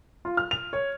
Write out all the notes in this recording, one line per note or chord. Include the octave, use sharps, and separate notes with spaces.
F4
F6
F7
C#5